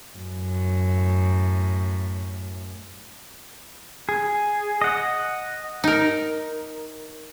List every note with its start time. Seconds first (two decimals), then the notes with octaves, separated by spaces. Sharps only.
0.16 F#2 A2
4.09 G#4
4.81 D#5 F#5
5.84 D#4 A#4